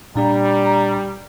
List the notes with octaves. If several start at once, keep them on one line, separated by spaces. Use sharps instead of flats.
A#2 G3 D4 A#5